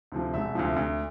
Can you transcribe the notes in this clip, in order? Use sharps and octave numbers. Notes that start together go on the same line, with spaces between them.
D2 C3 F3
E1 E5
D2 C3 F3
D2